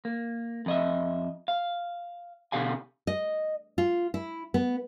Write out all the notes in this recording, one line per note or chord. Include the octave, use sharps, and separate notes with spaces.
A#3
F2 D#5 E5
F5
B2 D3 G4 F5 G#5
D#5
F4
E4
B3